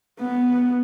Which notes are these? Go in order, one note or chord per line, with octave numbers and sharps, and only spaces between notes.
B3